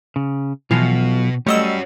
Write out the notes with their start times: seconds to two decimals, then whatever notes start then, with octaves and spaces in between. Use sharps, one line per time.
0.16 C#3
0.71 B1 B2 E3 F3 F4 F5
1.47 G3 A3 C#4 F#4 D#5 E6